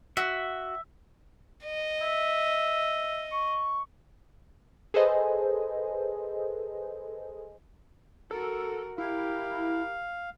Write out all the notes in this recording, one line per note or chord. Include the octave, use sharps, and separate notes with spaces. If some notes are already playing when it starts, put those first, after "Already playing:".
F#4 E5
D#5
E5
C#6
G#4 A4 B4 C5 D#5 G#5
F#4 A4 A#4
E4 G4 A#4 F5